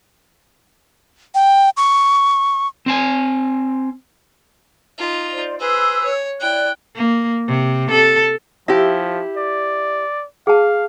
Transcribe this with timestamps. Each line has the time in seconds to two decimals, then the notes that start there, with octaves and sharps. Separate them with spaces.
1.35 G5
1.77 C#6
2.86 C4 C5 G#5
4.98 D#4 F4
5.27 C5 D5
5.59 G#4 B4 C5 E6
6.04 C#5
6.40 E4 D5 G5 F#6
6.95 A#3
7.47 C3
7.91 A4
8.68 F3 E4 G4 E5
9.37 D5
10.47 G#4 F5 A5